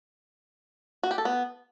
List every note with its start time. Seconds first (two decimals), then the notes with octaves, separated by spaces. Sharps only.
1.03 F#4
1.11 G4
1.18 A4
1.25 B3